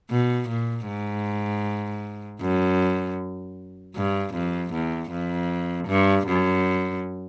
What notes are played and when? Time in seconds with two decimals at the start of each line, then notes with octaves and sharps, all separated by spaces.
0.10 B2
0.49 A#2
0.87 G#2
2.41 F#2
3.96 G2
4.34 F2
4.73 E2
5.11 F2
5.87 G2
6.27 F#2